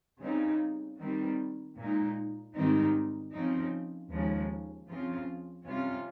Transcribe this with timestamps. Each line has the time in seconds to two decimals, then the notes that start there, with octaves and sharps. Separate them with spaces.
0.22 C#3 G3 C4 D#4
1.00 D#3 G3 C4
1.78 A#2 G#3 D#4
2.55 G#2 D#3 G3 C4 D#4
3.32 C#3 F3 C4 D#4
4.10 D#2 C#3 F3 G#3
4.88 C#3 F3 C4 F4
5.66 C3 G3 C#4 F4